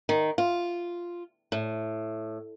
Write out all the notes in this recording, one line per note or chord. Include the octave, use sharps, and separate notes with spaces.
D#3
F4
A2